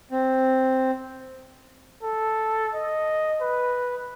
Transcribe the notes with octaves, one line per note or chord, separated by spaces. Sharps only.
C4
A4
D#5
B4